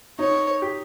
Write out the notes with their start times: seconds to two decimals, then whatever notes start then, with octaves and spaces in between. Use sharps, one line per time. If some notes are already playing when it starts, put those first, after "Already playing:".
0.19 D#4 C#5
0.62 G4